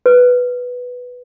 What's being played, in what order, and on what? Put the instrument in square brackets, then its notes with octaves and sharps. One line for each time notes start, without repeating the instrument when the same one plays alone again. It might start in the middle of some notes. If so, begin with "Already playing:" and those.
[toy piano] B4